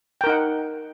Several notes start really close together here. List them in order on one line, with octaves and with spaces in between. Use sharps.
G5 A#4 D#4 F#5